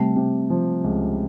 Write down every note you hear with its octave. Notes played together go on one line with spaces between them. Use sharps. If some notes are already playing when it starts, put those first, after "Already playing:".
Already playing: C3 G3 A3
C3
F3
C#2